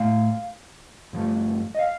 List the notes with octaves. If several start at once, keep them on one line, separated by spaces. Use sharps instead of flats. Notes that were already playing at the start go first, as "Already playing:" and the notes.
Already playing: A2 A3 F5
G2 F3 A3
D#5
F5